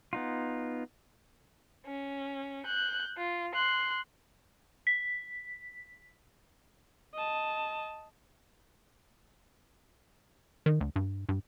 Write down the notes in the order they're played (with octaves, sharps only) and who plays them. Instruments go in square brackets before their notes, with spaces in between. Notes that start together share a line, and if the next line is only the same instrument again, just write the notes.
[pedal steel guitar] B3 D#4 F4
[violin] C#4
F#6 G6
F4
C6 F#6
[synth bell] B6
[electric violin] D#5 A5
[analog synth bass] D#3
D2
G2
G2